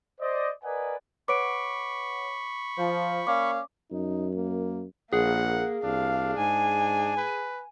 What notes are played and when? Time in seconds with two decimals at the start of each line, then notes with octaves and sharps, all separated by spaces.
0.20 C5 D5 D#5
0.63 A#4 B4 D5 D#5 F#5 G#5
1.28 B4 C#5 F#5 B5 C#6 D6 D7
2.77 F3 C5
3.27 A#3 C#4 D5 F5 D6
3.91 F#2 D#4
4.35 A#3
5.13 A#1 A#3 G#4 F#5
5.84 C2 D4 F5
6.38 G#2 G#5
7.17 B4